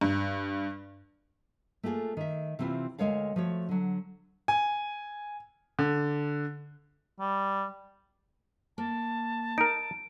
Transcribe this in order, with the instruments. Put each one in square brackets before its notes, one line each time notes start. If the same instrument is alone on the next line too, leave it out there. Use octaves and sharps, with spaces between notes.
[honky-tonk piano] G2
[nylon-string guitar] A3 A#3 F4 G4 G#4
D#3 E5
C3 E3 C4 E4 F4
D2 F3 G#3 A#4 C#5 F5
F3 A3 F#4 C#5
D3 F#3
[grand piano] G#5
D3
[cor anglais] G3
[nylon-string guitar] A#3 [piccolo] A5
[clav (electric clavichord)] D#4 A#4 [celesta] D7